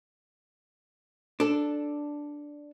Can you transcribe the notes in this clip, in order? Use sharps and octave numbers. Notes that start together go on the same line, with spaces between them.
D4 A4